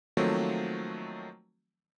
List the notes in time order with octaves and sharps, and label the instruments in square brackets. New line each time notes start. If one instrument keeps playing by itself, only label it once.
[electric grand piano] D#3 F3 F#3 A3 A#3 C4